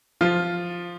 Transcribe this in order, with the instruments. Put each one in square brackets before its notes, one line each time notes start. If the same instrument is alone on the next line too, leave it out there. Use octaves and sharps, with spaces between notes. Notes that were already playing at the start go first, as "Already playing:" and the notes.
[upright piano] F3 F4